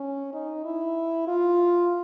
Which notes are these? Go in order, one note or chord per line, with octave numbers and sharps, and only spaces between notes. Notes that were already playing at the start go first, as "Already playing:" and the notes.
Already playing: C#4
D#4
E4
F4